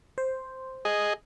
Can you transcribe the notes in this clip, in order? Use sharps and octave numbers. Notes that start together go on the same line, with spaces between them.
C5
G#4 D#5